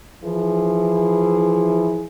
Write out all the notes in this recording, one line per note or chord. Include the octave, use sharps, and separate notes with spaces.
E3 F3 E4 G#4